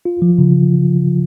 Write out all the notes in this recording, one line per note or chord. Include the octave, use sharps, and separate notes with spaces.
F4
F3
C#3